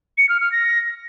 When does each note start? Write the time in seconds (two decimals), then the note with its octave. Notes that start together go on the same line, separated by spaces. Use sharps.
0.18 C#7
0.29 F6
0.40 F6
0.52 A#6